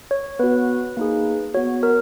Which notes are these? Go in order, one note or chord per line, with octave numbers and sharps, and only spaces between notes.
C#5
B3 F#4 B4
A#3 D#4 G#4
B3 F#4 C#5
A#4